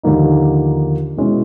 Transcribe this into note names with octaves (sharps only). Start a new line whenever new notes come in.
D#2 D3 F3 A#3 D#4
B2 G#3 C#4 E4